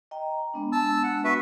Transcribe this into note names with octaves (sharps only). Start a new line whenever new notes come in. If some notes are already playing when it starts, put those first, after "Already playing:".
D#5 G5 A#5
G#3 B3 D4
A5 E6
F#5
F#4 B4 E5